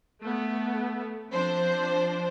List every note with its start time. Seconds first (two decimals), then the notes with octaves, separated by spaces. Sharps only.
0.24 A3 B3
1.32 F3 C4 D4 C5